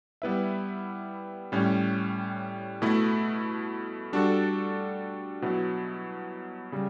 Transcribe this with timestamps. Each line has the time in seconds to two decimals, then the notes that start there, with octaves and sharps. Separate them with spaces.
0.22 G3 B3 E4 B4 E5
1.52 A2 G3 C#4
2.82 B2 A3 E4
4.13 G3 D4 F#4 A4
5.42 B2 F#3 B3 E4
6.72 C#3 G3